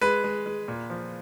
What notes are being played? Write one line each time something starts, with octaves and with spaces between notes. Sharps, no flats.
G#3 B4
G#3
G#3
A#2
F3